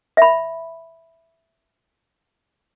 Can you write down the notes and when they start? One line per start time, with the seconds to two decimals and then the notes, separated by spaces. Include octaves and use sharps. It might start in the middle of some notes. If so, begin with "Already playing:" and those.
0.17 E5 B5